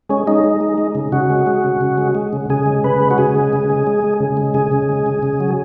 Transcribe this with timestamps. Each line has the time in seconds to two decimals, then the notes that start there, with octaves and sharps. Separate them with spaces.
0.09 G#3 C#4
0.27 G#3 D#4
0.44 G#3
0.61 G#3
0.78 G#3
0.95 C#3
1.12 C#3 F#4
1.30 G#3
1.47 G#3
1.64 C#3
1.81 C#3
1.98 G#3
2.15 G#3
2.33 C#3
2.50 C#3 G#4
2.66 G#3
2.84 C#3 B4
3.00 G#3
3.11 F#4
3.18 C#3 G#4
3.35 G#3
3.53 C#3
3.70 G#3
3.87 G#3
4.04 G#3
4.20 C#3
4.37 G#3
4.54 C#3 G#4
4.72 C#3
4.89 G#3
5.06 C#3
5.23 C#3
5.40 F#3